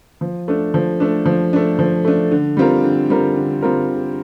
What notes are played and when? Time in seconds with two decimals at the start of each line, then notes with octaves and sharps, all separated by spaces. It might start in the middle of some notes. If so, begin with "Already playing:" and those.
0.21 F3
0.48 A3 D4
0.74 F3
1.00 A3 D4
1.26 F3
1.53 A3 D4
1.79 F3
2.05 A3 D4
2.31 D3
2.57 G3 C4 F4 A#4
2.84 D3
3.10 G3 C4 F4 A#4
3.36 D3
3.62 G3 C4 F4 A#4
3.88 D3